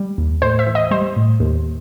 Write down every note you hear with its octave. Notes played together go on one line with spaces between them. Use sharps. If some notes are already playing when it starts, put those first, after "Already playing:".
Already playing: G3
D#2
A2 C5
E5
E3
D#5
G3 C5
A2
D#2